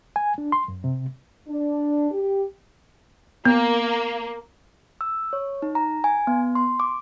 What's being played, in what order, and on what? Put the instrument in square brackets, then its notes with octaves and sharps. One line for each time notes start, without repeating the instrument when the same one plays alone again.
[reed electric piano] G#5
D4
C6
F#2
C3
[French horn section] D4
G4
[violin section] A#3 [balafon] B3
[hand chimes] E6
C#5
D#4
A#5
G#5
B3
C6
D6